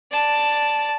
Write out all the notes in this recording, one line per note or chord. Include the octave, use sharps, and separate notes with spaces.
D5 A5